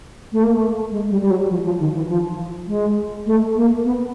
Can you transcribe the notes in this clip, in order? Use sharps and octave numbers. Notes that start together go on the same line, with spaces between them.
A3
A#3
A3
G#3
G3
G3
F#3
F3
F3
D#3
E3
F3
G#3
A3
A#3
B3